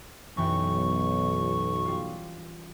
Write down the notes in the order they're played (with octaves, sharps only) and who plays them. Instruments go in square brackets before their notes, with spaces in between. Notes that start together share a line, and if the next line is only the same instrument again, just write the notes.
[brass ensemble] B1 [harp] F#2 E3 G5 [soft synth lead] C#6
[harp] G3 F4